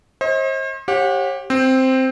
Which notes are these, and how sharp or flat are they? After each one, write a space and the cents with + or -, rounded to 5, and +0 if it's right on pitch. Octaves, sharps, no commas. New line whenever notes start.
C5 +40 D#5 +35
G4 +0 C#5 -35 F#5 -35
C4 +0 C5 +0